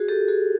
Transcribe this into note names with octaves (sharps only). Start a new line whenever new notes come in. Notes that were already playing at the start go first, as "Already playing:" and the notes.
Already playing: F#4 G#4
G4 A4
F#4 G#4